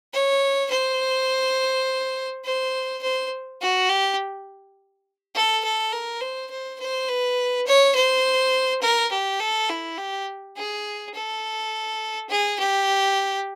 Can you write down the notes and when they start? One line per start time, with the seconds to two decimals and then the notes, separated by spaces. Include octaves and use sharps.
0.13 C#5
0.70 C5
2.45 C5
3.02 C5
3.61 F#4
3.89 G4
5.35 A4
5.64 A4
5.92 A#4
6.21 C5
6.51 C5
6.80 C5
7.08 B4
7.67 C#5
7.95 C5
8.82 A#4
9.11 G4
9.40 A4
9.69 E4
9.98 G4
10.56 G#4
11.14 A4
12.30 G#4
12.59 G4